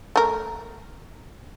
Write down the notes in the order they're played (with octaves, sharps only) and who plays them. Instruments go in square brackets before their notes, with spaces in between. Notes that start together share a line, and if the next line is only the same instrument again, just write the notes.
[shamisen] A3 A#4